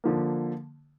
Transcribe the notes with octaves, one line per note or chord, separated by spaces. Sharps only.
D3 F3 A#3